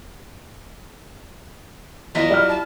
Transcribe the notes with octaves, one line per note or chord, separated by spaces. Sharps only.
E2 F#3 E4 F4 D#5 B6
G3 D5 F#5 F6
A5